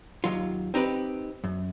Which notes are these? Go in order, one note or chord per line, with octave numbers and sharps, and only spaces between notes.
D#2 F#3 F4
C4 D#4 G4 B4
F#2